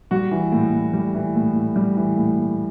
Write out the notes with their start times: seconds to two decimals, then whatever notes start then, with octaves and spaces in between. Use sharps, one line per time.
0.11 G3 F#4
0.31 E3
0.52 A2
0.72 A2
0.93 G3
1.14 E3
1.36 A2
1.55 A2
1.76 G3
1.97 E3
2.17 A2
2.39 A2